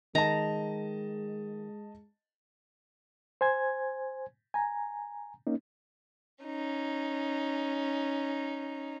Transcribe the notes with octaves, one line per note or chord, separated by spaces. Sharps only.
D#3 G#3 D#5 A5 A#5
C5 G#5 G#6
G#5 A#5
A#3 C#4 D#4
C#4 D#4